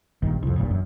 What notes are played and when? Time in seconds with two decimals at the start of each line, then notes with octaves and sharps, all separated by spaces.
0.22 A#1 G2 D#3
0.43 C2 F2
0.56 E1 A1 G2 A#2
0.71 F#2